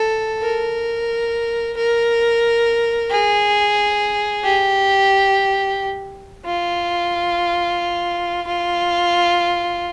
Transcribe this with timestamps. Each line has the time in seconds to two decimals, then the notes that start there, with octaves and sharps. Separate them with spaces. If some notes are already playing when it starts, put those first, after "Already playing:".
Already playing: A4
0.43 A#4
1.77 A#4
3.11 G#4
4.44 G4
6.45 F4
8.47 F4